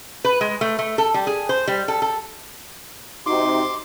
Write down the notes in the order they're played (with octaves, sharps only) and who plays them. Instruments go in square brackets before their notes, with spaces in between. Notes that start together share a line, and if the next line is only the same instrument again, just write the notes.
[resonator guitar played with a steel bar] B4
G#3
A3
A3
A4
G3
G#4
C5
G3
A4
A4
[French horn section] C3 D#4 F#4 [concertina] C6 D6